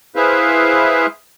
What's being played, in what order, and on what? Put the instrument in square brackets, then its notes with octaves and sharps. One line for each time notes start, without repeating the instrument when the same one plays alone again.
[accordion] E4 G#4 B4 C5 E5 F5